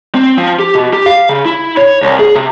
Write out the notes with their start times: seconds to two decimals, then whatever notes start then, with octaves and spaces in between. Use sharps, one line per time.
0.15 C4
0.37 F3
0.59 G4
0.75 B2
0.93 G4
1.06 F5
1.29 C#3
1.45 E4
1.77 C#5
2.02 C2
2.19 G#4
2.35 C3